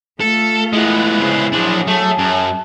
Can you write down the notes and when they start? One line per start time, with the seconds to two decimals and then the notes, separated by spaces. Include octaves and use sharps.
0.21 A3 F4 A4
0.73 G#3 B3 E4
1.20 C#3 C5
1.53 F3 F#3 D4 G#4
1.88 A3 A5
2.19 F#2